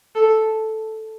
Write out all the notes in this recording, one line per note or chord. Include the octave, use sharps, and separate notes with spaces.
A4